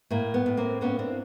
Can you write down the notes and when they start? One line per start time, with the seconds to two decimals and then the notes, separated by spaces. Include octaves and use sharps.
0.10 A2 A#3
0.34 B3
0.46 A2
0.57 A#3 C4
0.81 A#3 B3 C#4
0.99 C4 D4